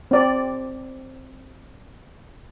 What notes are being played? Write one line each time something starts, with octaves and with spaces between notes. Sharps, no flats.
C4 D5